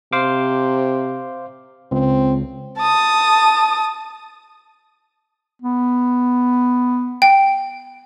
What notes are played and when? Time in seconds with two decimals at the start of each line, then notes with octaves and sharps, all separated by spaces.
0.13 C3 C5 F5 D6
1.92 C#2 C4
2.78 A5 D#6
5.62 B3
7.22 G5